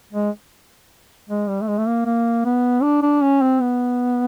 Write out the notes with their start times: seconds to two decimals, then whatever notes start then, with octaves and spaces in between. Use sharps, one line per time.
0.13 G#3
1.29 G#3
1.48 G3
1.62 A3
1.68 G#3
1.78 A3
1.87 A#3
2.05 A#3
2.45 B3
2.83 D4
3.02 D4
3.22 C#4
3.41 C4
3.60 B3